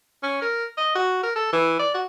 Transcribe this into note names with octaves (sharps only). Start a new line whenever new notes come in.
C#4
A#4
D#5
F#4
A#4
A4
E3
D5
F#4